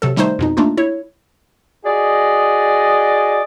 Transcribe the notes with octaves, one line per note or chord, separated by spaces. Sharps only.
C3 F#3 A4
D#3 G3 A3 D#4 C5
F2 B2 D#4
A3 A#3 D4 D#4 F4
E4 C#5
F#4 G#4 D5 D#5